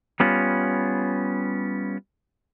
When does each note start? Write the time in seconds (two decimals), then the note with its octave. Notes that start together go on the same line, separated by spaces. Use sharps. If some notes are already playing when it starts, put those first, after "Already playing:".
0.20 G3 B3 C#4 F4